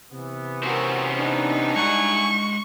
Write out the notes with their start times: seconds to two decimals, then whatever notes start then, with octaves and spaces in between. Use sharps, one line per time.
0.13 C3 E3 B3
0.63 C4 C#4 F#4 A#4 C5
1.18 D4 D#4
1.76 G3 G#3 E4 F#5 G#5 C#6